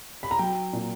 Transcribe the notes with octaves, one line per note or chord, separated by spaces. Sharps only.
B5
A#5
F#3 G5
A#2